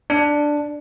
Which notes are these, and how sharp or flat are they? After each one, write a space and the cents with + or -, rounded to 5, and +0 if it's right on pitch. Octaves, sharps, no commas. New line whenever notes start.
D4 +5